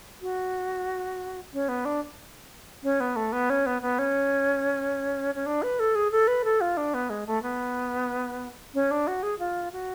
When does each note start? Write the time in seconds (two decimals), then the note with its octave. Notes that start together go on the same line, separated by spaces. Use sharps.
0.22 F#4
1.53 C#4
1.69 B3
1.85 D4
2.83 C#4
3.00 B3
3.16 A3
3.32 B3
3.50 C#4
3.66 B3
3.82 B3
3.99 C#4
5.35 C#4
5.46 D4
5.63 B4
5.79 A4
5.95 G#4
6.11 A4
6.28 B4
6.44 A4
6.61 F4
6.77 D4
6.94 B3
7.10 G#3
7.27 A3
7.43 B3
8.75 C#4
8.91 D4
9.07 F#4
9.23 G#4
9.39 F4
9.73 F#4